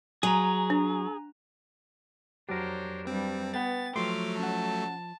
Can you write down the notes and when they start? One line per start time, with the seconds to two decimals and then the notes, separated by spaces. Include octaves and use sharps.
0.23 F#3 G#4 G#5 A#5
0.70 D4
2.49 F2 F#3 D4 G4 A#4 C5 C#5
3.07 G2 G3 C4
3.54 B3 B4 G5 A6
3.96 F3 F#3 A3 C6 D6 F6
4.39 C#4 F#5 A5